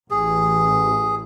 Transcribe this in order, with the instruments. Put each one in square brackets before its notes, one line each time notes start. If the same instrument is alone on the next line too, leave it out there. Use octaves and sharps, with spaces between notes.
[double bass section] A1 [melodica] G#4